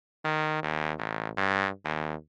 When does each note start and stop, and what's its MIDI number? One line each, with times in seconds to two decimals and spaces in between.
0.25 0.59 51
0.63 0.93 39
0.98 1.29 33
1.38 1.69 43
1.85 2.15 39